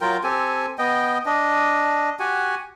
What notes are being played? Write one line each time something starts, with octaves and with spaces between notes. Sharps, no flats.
F#3 F4 A#4 G5
C4 G4 A4 G#5
B3 D#5 G5
D4 D#5
F#4 G4 F#5 G#5